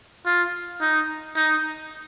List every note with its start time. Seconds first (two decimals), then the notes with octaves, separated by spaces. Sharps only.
0.26 F4
0.81 D#4
1.36 D#4